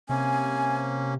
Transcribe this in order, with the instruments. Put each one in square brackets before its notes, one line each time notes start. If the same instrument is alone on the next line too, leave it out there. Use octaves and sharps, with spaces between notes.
[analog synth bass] C3 [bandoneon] A#3 C#4 [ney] G#5